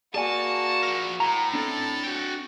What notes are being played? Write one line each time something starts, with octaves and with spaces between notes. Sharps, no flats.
A#3 F#4 G#4 D5 G#5 A5
F3 A#4
A2 A#5
C4 D4 A4
F#4 G5